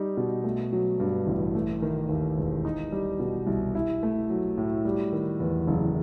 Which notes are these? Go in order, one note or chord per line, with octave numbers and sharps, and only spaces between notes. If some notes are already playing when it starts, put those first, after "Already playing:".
Already playing: G3 D#4
B2
A3
F#3
G2
A1
A3
D#3
D#2
E1
D#4
G3
B2
C2
E4
A3
F#3
A2
G3
D#3
E2
F#1